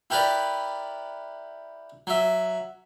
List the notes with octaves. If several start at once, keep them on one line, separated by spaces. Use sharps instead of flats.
E4 G4 A#4 B4 D5
F#3 E5